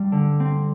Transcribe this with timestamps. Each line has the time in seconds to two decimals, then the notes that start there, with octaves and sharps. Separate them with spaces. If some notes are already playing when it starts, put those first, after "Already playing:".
Already playing: G2 G3
0.12 D3
0.40 C4